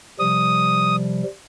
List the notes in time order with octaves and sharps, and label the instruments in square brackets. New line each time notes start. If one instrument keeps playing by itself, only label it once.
[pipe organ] C3 F3 G3 [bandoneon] D#6